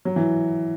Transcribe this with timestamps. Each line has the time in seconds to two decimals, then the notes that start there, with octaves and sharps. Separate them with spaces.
0.05 F#3
0.16 E3